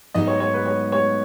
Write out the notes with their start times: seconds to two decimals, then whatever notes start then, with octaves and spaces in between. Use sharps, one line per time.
0.14 G#2 F#3 B3 D#4 D#5
0.27 C#5
0.40 C#5
0.54 B4
0.65 C#5
0.92 C#5